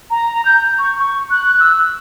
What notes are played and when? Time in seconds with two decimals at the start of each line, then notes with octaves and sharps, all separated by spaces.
0.10 A#5
0.45 G6
0.79 C#6
0.99 C#6
1.31 F#6
1.60 E6